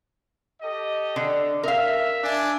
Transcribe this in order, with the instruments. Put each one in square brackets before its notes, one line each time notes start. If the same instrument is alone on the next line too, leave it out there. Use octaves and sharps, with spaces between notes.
[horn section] G4 A4 D#5
[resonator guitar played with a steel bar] D3
[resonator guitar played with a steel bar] A#4 F5 [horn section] E5
[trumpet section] D4 G#5